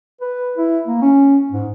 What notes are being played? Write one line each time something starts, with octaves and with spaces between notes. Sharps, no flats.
B4
E4
A#3
C#4
G#2